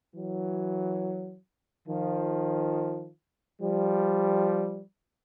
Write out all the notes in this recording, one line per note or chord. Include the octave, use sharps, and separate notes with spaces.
E3 F#3
D#3 F3
F3 G3